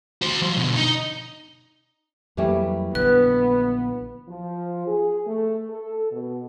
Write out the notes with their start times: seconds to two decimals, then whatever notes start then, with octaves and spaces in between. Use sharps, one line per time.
0.22 F#4 C5
0.42 F3 F#3
0.56 B2 D3
0.76 D#4
2.37 F2 E3 F#3 G3 A3 A#3
2.95 A#1 D3 B3 B4 F#6
4.29 F3
4.87 G#4
5.27 A3
5.70 A4
6.11 B2